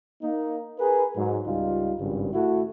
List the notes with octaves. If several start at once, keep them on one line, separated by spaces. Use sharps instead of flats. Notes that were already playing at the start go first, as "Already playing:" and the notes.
A#3 D#4
G#4 A#4 B4
G#2 F#3
C#2 G3 D#4 F4
G#1 G2 C#3
A3 E4 F#4